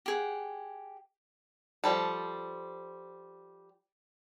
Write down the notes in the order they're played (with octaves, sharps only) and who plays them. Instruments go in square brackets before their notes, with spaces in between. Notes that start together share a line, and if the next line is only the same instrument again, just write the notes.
[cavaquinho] G4 G#4 F#5
[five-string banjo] F3 G3 A4